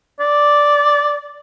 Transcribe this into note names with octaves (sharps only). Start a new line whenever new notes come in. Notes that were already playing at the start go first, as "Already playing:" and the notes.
D5